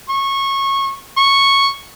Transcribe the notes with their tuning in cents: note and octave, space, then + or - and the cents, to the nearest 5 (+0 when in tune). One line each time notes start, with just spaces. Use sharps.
C#6 -20
C#6 -5